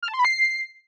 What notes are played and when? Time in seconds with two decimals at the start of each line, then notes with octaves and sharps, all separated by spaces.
0.03 F6
0.08 A5
0.14 C6
0.19 B5
0.25 C7